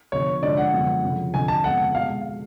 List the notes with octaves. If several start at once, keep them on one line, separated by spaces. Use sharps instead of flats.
D3 F3 B3 C#5
D3 F3 G#3 D4 F#4 D5
F#5
F#2 D3 F3 G#3 B3
F2 C#3 F3
F2 D3 F3 G#5
A5
F2 C#3 G#3 B3 F#5
B2 G#3 F5